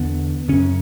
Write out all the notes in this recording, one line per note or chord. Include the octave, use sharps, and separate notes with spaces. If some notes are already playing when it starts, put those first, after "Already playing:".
Already playing: E2 D3 B3
F#2 C#3 C#4